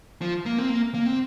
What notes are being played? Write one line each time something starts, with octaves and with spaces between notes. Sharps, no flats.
F3
A#3
C4
A#3
A#3
C4